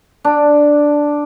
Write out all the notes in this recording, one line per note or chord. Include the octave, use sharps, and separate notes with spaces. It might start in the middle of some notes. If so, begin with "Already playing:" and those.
D4